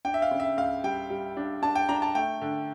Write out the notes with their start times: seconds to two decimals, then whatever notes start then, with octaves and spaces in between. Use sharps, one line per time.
0.05 D4 G5
0.14 E5
0.22 F5
0.31 C#3
0.40 E5
0.57 C#2 F5
0.84 G3 G5
1.10 G3
1.37 D4
1.62 D4 A5
1.75 G5
1.89 D4 A#5
2.02 A5
2.15 A3 G5
2.41 D3